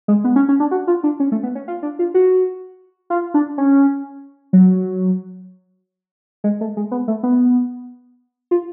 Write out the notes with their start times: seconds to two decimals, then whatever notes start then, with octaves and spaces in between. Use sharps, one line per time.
0.08 G#3
0.24 B3
0.36 C#4
0.49 C#4
0.60 D4
0.71 F#4
0.87 F4
1.04 D4
1.20 C#4
1.32 A3
1.43 B3
1.55 C#4
1.68 F4
1.83 D4
1.99 F4
2.14 F#4
3.10 F4
3.34 D4
3.58 C#4
4.53 F#3
6.44 G#3
6.61 A3
6.77 G#3
6.91 B3
7.08 A3
7.23 B3
8.51 F4